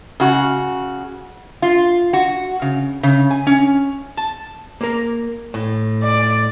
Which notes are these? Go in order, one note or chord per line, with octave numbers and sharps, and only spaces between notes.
C#3 F#4
F4
F#4
C#3
C#3
G#5
C#4
A5
A#3 A#4
A2
D5